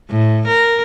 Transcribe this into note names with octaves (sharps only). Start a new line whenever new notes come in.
A2
A#4